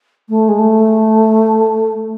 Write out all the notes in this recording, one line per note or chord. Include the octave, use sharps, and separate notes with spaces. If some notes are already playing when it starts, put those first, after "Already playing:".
A3
G#3
A3